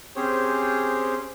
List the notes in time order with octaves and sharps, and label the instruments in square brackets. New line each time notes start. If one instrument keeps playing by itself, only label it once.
[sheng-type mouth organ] C4 C#4 G4 G#4 C5 C#5